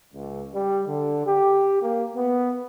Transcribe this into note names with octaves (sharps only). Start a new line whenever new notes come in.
C#2
G3
D3
G4
A#3
B3